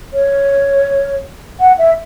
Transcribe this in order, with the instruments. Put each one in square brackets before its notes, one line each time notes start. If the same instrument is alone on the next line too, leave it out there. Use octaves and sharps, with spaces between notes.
[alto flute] C#5
F#5
E5